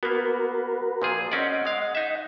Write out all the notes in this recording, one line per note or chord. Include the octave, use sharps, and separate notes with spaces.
A#3 B3 F#4 A#4 B4
A#2 F3 G#4
C4 C#4 D5 D#5 F#5
G#3 F5
D#4 E5